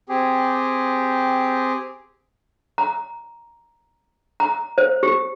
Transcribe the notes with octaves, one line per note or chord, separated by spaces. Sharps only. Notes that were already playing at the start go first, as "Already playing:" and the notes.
C4 G4 G#4
A#5
A#5
C5
G4